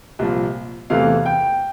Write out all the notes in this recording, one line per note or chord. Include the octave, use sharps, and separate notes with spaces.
C2 A#2 F3
E2 C3 E3 A3 F5
G5